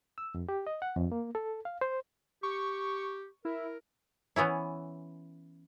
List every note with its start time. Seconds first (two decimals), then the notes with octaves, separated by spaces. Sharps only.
0.18 E6
0.34 F2
0.49 G4
0.67 D#5
0.82 F#5
0.96 F2
1.12 A#3
1.35 A4
1.65 F5
1.81 C5
2.43 G4 C#6
3.45 E4 A#4
4.36 E3 B3 C#4 E4